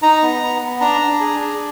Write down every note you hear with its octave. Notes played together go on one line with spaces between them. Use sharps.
D#4 A#5
B3
B3
B3
D4 A#5
D4
G#4
D4